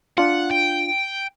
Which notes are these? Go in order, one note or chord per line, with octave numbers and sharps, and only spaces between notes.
D4 F4 F#5
G5